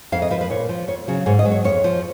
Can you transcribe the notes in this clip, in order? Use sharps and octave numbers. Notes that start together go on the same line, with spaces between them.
F2 F5
D#5
F3 B4
B4
A#2 C#5
F3
F2 C#5
C#3 F#3
G#2 C#5
D#5
F#3
C#5
F2 C#5
F3